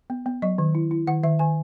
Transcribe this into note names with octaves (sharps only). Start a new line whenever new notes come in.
B3
B3
F#3 D#5
D#3
E4
E4
D#3 F#5
D#3 E5
D#3 G#5